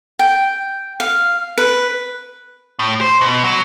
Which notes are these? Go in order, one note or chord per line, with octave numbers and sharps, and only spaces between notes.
G5
F5
B4
A2
C5
B2
F#3